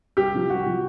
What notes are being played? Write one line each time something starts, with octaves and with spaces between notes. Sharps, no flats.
C2 G4
C3 F3
C2 F#4
C3 F3